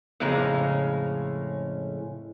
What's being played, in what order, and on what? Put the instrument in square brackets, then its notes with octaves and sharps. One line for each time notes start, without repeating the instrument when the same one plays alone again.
[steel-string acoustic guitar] F2 A2 C#3 G#3 C#4 A#5